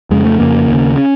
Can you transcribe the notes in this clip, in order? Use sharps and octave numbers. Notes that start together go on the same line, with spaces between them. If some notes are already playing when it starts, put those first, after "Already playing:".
F2 C#3 G#3
A3
F2 C#3 A#3
D#2 C#3
C#4